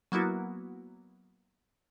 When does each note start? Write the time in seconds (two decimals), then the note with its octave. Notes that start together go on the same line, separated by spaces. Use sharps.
0.12 F#3 A#3 B3 E4 F#4